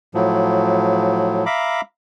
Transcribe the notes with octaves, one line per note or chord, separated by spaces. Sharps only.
A2 F3 F#3
E5 F5 A#5 B5 D6